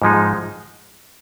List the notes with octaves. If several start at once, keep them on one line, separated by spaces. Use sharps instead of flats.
G#2 F3 G#3 D#4